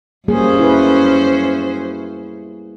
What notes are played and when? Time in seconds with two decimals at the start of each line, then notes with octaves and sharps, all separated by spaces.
0.28 F#2 G3 A#3 C#4 G#4 C5
0.59 E4 B4